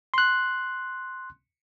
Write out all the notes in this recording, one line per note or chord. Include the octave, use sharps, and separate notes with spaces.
C6 F#6